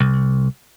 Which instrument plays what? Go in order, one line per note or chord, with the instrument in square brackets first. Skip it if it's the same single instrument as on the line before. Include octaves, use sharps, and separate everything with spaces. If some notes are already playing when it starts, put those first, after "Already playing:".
[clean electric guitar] C2